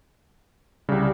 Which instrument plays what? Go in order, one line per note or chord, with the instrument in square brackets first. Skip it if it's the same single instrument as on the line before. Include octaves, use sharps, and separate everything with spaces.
[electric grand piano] C2 C#3 [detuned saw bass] G3